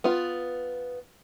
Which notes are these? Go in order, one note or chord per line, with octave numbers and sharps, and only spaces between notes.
B3 F4